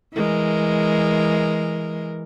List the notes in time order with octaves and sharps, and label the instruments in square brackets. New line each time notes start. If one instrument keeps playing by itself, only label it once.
[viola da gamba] E3 G#3 A#4